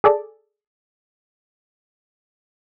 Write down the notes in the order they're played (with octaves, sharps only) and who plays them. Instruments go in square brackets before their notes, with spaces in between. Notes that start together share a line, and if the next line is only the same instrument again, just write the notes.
[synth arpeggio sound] G#4 A4 D5